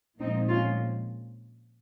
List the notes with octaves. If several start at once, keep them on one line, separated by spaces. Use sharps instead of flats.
A#2 F3 G#3 C4 D#4
C#4 F4